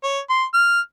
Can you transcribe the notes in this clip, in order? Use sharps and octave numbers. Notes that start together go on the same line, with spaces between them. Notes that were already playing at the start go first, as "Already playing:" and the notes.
C#5
C6
F6